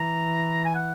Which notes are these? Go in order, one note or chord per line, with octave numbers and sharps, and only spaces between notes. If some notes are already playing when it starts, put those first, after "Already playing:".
Already playing: E3 A#5
G#5
F#5